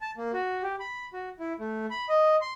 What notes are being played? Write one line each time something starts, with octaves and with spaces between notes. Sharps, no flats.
A5
A#3
F#4
G4
B5
F#4
E4
A3
B5
D#5
C6